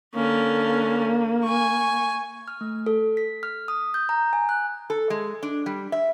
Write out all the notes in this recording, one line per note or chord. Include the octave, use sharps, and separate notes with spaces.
D3 A#3 C#4
G#5 C#6
F6
A3
A4
B6
F6
D#6
G6
A#5
G#5
F#6
A4
G#3
D4
G3
E5